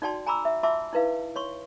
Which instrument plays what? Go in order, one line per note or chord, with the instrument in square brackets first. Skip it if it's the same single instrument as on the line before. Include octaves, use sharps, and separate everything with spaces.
[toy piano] D#4 F#4 D5 G5 A5 C6
G#5 A#5 B5 D6 E6
E5
F4 E5 A5 C6 D6 E6
D#4 E4 B4 F5
C#5 C6 C#6